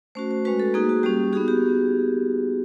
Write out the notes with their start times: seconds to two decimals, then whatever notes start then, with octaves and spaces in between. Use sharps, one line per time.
0.15 A3 C#4 F#4 C5
0.31 C5
0.45 G#3 C#4 F#4 B4
0.60 A4
0.74 A#3 D#4 F#4 G#4
0.89 F#4
1.03 G3 A#3 C#4 G4
1.33 B3 D#4 F#4 G#4
1.48 G4